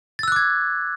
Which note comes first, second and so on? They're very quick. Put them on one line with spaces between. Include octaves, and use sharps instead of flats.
A6 E6 F#6 D6 G#6